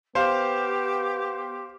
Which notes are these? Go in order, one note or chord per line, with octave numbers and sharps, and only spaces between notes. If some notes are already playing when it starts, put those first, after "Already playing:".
B3 G4 C5 F5